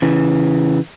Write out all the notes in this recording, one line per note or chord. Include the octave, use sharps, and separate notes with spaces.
C#3 E3